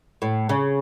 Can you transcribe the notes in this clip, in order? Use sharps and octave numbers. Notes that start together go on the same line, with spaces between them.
A2
C#3